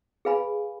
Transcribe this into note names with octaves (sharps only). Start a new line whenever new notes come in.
G#4 B4 F5 G#5 B5